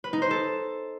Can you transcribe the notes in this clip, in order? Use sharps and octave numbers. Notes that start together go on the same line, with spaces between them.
B4
D#4
C5
A4